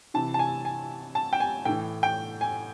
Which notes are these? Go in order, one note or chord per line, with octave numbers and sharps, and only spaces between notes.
C3 E3 A5
A5
G#5
G#5
A5
G5
G#5
A2 E3 G5
G5
G#5